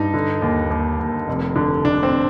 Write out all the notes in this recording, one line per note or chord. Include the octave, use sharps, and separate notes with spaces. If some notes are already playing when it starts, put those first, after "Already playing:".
Already playing: G2 D#4
D3
D#2
D#2
D#2
F1
D3
D3 D4
C4